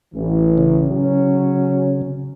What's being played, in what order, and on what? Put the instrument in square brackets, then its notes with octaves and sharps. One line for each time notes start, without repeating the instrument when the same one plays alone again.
[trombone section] A1 E3
[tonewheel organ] C#3
[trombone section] F#3 C#4